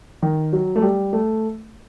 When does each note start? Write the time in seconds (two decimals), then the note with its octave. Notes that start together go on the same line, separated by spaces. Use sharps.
0.22 D#3
0.53 F#3
0.76 A3
0.82 G3
1.13 A3